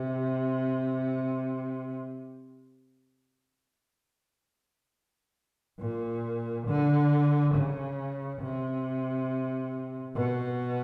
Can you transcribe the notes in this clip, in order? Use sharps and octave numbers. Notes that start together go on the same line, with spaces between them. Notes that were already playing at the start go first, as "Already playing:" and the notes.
Already playing: C3
A#2
D3
C#3
C3
B2